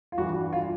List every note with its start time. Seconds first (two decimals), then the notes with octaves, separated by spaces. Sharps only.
0.12 F4
0.18 G2 E3 G3 F#4
0.53 F4